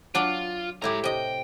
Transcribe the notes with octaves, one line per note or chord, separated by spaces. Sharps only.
F#3 D4 F4 D5
A2 G#3 E4 G4 A#5
C3 D#5 G5